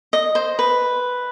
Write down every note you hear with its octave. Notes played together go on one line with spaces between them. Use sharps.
D#5
C5
B4